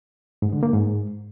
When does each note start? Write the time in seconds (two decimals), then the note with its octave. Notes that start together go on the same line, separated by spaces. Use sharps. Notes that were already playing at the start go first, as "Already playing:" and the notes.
0.42 G#2
0.52 D3
0.63 A#3
0.73 G#2